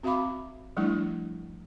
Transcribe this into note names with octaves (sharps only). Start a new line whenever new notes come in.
C4 F#4 E5 F5 B5 D6
F3 G3 A3 D4 E4